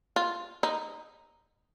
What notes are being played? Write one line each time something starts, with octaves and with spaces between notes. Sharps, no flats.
F4
D#4